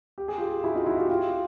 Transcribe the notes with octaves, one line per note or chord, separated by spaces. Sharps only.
G4
G#4
F4 G4
E4 F#4
D#4 F4
E4 F#4
F4 G4
F4 G4